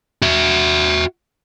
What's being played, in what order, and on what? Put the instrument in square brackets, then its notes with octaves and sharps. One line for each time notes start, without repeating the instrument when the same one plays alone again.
[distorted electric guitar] F#4 E5